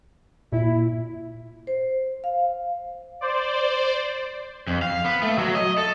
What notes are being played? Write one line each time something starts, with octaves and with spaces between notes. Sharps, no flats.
A#2 E4
C5
F5
C5 D5
F2
F5
B3
A3
F#3
D#5
A4